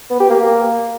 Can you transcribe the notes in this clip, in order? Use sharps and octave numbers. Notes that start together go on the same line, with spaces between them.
B3
G4
A#3